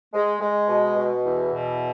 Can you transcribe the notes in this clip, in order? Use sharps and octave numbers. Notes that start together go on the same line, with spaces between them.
G#3
G#3
B2
B2
E2
B2